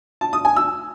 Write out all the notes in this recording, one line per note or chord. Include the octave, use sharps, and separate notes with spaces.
A5
D#6
G#5
E6